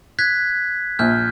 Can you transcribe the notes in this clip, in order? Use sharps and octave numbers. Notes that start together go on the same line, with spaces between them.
F#6 G#6 B6
A#1 F6 G6